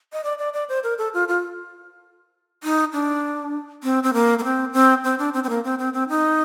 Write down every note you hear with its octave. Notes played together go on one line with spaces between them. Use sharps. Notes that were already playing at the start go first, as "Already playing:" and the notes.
D#5
D5
D5
D5
C5
A#4
A4
F4
F4
D#4
D4
C4
C4
A#3
A#3
C4
C4
C4
D4
C4
C4
A#3
C4
C4
C4
D#4